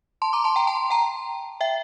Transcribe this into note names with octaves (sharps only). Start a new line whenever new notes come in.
A5 C6
A#5 D6
A5 C6
G5 A#5
A5 C6
G5 A#5
E5 G5